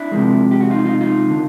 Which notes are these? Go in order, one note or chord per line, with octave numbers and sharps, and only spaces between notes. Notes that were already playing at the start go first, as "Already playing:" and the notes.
Already playing: D4 E4
C3 F3 G#3
G4
F#4
D#4 F4
D#4 F4
D#4 F4
D3